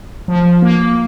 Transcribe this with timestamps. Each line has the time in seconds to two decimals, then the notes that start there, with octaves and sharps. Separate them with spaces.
0.28 F3
0.62 A#3